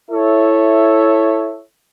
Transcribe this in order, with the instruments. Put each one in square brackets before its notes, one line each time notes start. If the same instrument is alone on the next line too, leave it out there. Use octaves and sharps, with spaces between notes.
[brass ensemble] E4 A4 C#5 E5